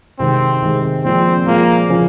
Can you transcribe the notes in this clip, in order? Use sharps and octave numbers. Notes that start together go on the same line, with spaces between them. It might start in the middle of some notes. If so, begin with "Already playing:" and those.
C3 D#3 G#3 C4
C3 D#3 G#3
A#2 F3 G#3 C4
A#2 F3 G#3 A#3
C#3 F3 G#3 C#4